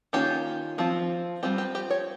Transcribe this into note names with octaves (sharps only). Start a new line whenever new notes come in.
D#3 A#3 C#4 F4 G4
F3 C4 F4
G3 C4 F4 G4
G4
G4
C#5